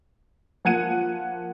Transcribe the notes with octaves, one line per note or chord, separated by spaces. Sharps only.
F3 A#3 F#5 G#6 C#7 D#7